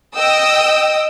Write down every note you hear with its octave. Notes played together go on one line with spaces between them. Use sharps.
D#5 G5 D#6 E6